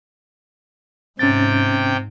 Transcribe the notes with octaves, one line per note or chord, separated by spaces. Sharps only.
G#2 C3 C#4 G5 A6